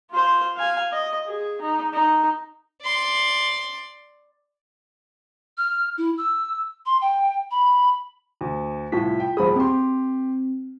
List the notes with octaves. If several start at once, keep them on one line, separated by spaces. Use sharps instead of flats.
F4 C5
F5 G#5
D#5
G#4
D#4
D#4
D5 C6
F6
E4
E6
C6
G5
B5
D2
C2 A2 F4 A5 B6
G5
D#1 G#4 C5 B5 D#6
C4 G4 C6